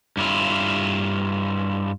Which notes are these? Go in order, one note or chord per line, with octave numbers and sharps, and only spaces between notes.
G2 E4 F4